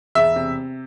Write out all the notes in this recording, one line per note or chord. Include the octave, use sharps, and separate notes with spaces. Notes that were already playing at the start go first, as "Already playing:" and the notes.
E1 E5
C3